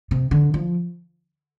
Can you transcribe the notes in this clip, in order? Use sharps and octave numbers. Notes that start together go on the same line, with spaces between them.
C3
D3
F3